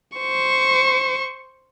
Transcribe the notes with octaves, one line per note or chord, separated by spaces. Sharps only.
C5 C#6